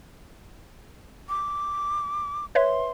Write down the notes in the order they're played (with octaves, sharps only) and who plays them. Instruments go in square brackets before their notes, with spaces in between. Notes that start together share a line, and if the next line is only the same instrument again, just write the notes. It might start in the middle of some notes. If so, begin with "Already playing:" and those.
[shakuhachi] D6
[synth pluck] B4 C#5 E5 [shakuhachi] C6